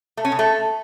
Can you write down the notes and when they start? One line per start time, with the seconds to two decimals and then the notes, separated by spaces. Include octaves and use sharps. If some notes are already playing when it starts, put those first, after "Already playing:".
0.17 A3
0.25 C#4
0.32 C#3
0.39 A3